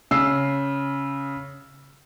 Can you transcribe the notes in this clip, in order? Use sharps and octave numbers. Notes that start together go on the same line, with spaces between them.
C#3 E6 C7